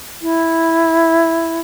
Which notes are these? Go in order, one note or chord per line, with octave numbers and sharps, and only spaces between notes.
E4